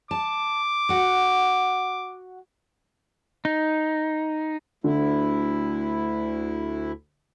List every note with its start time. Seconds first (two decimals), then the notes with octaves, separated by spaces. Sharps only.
0.11 A5 D6
0.89 F#4 F#5
3.45 D#4
4.84 D2 D3 E4